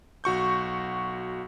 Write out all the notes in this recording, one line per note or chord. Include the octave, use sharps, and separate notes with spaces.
B1 F#4 C#6 G6